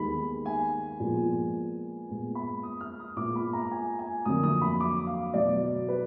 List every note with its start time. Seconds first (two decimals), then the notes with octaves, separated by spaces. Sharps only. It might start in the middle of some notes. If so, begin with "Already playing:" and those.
Already playing: D#2 D#3 G#3 B3 B5
0.46 G#5
1.00 A#2 F3 G#3 B3
2.09 A#2 G#3 B3
2.35 B5
2.63 D#6
2.80 F6
3.00 D#6
3.16 A#2 G#3 B3 D6
3.36 B5
3.53 A#5
3.71 G#5
3.99 G#5
4.25 F2 D3 F#3 A#3 D#6
4.43 D#6
4.61 B5
4.80 D6
5.06 F5
5.34 B2 F#3 B3 D5
5.88 B4